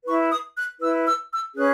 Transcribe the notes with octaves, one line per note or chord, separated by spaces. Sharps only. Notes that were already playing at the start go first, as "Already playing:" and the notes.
E4 B4 C#6
D#6
F#6
E4 B4 E6
E6
E6
C#4 G#4 B4 F#6